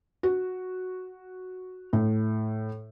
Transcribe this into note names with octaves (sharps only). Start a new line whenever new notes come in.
F#4
A2